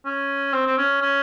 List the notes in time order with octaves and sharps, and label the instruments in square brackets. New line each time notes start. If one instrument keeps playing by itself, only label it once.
[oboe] C#4
C4
C4
C#4
C#4